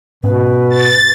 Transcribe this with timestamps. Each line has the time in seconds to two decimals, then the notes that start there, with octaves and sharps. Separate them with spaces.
0.24 G#2 B2 B3 C#4 B4
0.70 A6